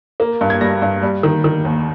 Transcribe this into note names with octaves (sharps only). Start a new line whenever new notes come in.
A#3
G2
G#6
G3 A#6
G2
G3
D#3
D#3
D#2